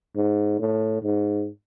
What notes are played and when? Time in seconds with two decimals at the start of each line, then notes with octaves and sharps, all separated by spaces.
0.16 G#2
0.59 A2
1.02 G#2